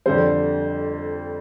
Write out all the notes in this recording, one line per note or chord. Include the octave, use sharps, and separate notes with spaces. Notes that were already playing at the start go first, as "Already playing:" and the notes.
F2 D3 G3 C5